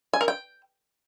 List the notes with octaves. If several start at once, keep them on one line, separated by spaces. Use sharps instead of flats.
G#5
A#4
G5